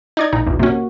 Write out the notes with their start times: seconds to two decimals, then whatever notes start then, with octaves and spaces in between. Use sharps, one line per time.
0.17 D#4 D5 G#6
0.33 A#1 D#4
0.47 B1 E2
0.59 C3 A#3 C#4 F#4